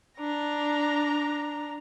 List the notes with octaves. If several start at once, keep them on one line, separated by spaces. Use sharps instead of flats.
D4 A#5